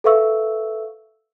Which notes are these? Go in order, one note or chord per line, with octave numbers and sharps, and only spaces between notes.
A4 B4 E5 F5 C#6 E6